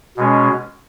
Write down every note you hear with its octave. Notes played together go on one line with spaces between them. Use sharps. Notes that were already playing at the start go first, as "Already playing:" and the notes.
B2 G#3 C#4